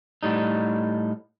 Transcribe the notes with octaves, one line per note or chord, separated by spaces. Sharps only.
A2 G3 D#4